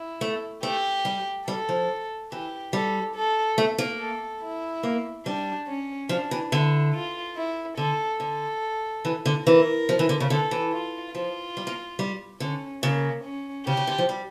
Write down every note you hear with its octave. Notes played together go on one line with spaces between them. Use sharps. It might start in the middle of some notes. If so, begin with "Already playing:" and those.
Already playing: E4
A3
A3 G4
G3
G3 A4
F3
E3 G4
G3 A4
A4
A3
A#3
A4
E4
A#3
G3 D4
C#4
F3 D4
E3
D3 E4
F4
E4
D3 A4
D3 A4
E3
D3
E3 A#4
F3
E3
D3
C#3
D3 A4
E3
F4
F3 F4
G3
A#3
G3
D3 C#4
C#3 A#3
C#4
C#3 G4
C#3
D3
F3
G3